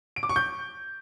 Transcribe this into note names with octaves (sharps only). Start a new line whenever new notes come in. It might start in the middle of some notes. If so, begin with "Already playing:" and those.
D7
D6
C#6
G6